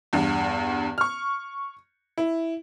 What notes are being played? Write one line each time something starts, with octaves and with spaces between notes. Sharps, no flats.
E2 G2
C#6 F6
E4